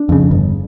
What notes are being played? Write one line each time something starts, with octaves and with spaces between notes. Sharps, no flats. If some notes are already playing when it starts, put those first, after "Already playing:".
Already playing: D4
F2 C#3
G1